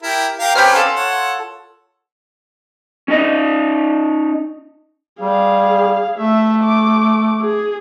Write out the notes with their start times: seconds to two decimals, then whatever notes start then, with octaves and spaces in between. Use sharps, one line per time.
0.03 E4 G4 A#4
0.39 G4 A#4 F5
0.55 C4 C#4 G4 B4 A#5 F6
0.75 F4 A4
0.96 C#5 F#5
3.08 C#4 D#4 D#5
5.21 G3 G#4 F5
6.18 A3 E5
6.64 D6
7.41 G#4